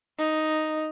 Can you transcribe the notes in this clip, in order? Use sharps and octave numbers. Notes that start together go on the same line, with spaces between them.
D#4